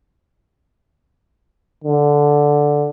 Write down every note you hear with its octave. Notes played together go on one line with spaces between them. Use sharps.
D3